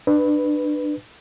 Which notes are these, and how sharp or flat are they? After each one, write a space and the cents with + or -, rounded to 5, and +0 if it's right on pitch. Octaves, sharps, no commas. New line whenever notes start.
D4 +25 B4 +0